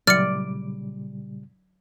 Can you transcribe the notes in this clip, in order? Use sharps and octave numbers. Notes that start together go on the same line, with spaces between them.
A#2 C#3 F#3 G3 D5 F6 C#7